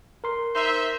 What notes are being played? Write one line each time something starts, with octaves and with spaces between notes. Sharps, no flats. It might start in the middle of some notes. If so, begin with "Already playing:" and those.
A#4 C6
D#4 C5 E5